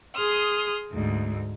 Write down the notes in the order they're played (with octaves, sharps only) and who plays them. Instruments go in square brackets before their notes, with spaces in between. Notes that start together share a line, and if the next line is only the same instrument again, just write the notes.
[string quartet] G#4 C6 D#6 F6
D2 G#2